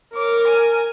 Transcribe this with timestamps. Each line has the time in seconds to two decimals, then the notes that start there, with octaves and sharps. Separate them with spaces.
0.15 A#4 C#5 D6
0.48 G#5